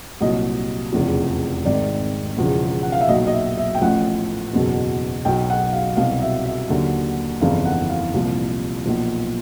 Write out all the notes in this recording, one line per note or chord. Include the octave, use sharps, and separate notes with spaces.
C2 A#2 F#3 D#5
F1 E2 C#3 F3
G#1 G#2 D#3 D5
E1 E2 C#3 F3
F#5
F5
E5
B1 A#2 F#3 D#5
D#5
E5
E5
G5
A1 A2 F3 F#5
F#1 E2 B2 F#3
B1 B2 F#3 G5
F#5
F5
C2 B2 F#3 F5
E5
E5
D#2 D3 F#3
G1 F2 C#3 E3 F5
F#5
F5
C2 A#2 F3
B1 A#2 F3